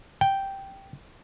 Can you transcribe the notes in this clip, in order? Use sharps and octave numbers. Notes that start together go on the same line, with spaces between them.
G5